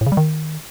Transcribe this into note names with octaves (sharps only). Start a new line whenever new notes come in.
A2
C#3
G3
D#3